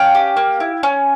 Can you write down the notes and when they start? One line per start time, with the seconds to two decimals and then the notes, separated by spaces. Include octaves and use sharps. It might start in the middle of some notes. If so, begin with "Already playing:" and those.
Already playing: C#4 F5 G5
0.15 G4
0.37 A#3
0.60 E4
0.83 C#4